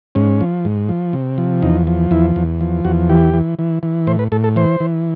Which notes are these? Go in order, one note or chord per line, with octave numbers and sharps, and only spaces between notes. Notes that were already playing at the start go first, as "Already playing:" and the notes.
G#2 C#4
F3
G#2
F3
C3
F3
E2 D#4
F3
E2 E4
E2
F3
E2 F#4
E3 G4
E3
E3
E3
A2 C5
B4
A2 A4
A4
E3 C5
E3